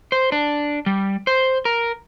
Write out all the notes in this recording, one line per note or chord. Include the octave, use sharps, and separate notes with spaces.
C5
D4
G3
C5
A#4